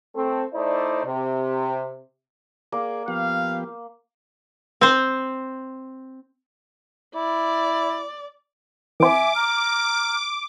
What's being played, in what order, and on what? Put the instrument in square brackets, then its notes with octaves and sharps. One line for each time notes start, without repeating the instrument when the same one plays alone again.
[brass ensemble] A3 C4 A4
A3 D#4 E4 C5 D5
C3
[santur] A#3 [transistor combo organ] G#4 D5
[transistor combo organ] F3 B3 G4 [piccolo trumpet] F5
[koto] C4 C5
[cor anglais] E4 [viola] D5
[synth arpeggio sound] E3 C4 [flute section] E5 G#5 [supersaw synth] D6
[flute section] A#5 F6